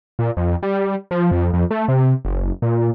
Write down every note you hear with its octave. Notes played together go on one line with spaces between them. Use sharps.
A#2
F2
G3
F3
F2
F2
A3
C3
F#1
A#2